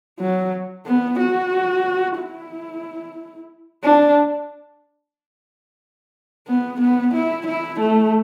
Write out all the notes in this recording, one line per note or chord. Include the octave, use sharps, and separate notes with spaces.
F#3
B3
F#4
E4
D4
B3
B3
E4
E4
A3